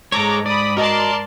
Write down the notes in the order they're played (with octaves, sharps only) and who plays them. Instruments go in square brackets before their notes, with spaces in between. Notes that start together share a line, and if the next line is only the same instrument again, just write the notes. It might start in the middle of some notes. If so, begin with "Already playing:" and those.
[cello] G#2 [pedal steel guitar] G#3 C#5 [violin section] A4 A#5 D6
[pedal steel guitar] D5 [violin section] B5 D#6
[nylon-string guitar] F#4 D#5 [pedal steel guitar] A#4 [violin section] D5 A5 C6